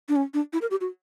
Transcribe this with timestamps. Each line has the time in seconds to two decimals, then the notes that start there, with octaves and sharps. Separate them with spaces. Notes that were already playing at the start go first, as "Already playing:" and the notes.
0.09 D4
0.16 C#4
0.34 D4
0.53 E4
0.62 A#4
0.71 G4
0.81 F#4